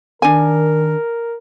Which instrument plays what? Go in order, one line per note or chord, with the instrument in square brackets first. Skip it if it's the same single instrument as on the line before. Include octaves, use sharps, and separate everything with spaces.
[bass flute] D#3 [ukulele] D4 G#5 [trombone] A#4